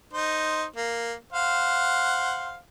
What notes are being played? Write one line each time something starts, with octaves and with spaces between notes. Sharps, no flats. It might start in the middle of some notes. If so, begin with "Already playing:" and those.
D#4 C5
A#3
C5 F5 F#5